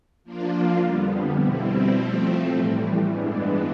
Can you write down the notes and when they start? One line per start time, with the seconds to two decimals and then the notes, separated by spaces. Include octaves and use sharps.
0.24 F3 A#3 D4 F4
0.80 F2 D3 G3 B3
1.37 B2 G3 C4 E4
1.94 F3 A3 C4
2.51 A2 E3 G3
3.07 G2 E3 G#3 B3 D4